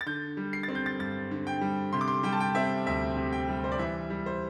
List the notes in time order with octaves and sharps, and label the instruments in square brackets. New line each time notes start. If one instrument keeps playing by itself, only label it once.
[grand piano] A6
D3 G6
G3
C7
A6
C4
G6
A6
G2 A6
D3
G5
G3
C3 C6
D6
C6
G3 G5
A5
G5
C4 E5
D2 E5
C3
G5
G3
C5
D5
E3 E5
G3
C5